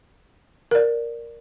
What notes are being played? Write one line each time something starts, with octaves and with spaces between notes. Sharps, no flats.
A#4 D5